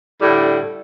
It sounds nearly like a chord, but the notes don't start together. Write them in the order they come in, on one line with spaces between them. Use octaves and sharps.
G3 A2 D3